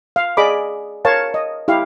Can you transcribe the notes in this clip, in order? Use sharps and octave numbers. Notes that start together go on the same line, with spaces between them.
F5
G#4 D5 D#5 B5 D6
A#4 C#5 F5 A5
D#5
E4 G4 F5